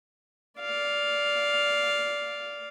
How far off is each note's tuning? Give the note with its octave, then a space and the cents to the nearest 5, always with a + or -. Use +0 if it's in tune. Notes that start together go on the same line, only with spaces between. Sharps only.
D5 -15 F5 +0